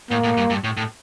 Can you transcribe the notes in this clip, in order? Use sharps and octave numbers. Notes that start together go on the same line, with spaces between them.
A2 A#3
A2
G2
G2
A2
A2